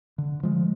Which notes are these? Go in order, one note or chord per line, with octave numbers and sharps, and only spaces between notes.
D3
F3 G#3